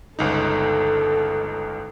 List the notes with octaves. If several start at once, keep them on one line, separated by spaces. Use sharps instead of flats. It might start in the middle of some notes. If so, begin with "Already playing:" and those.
G1 C#2 D#4 A4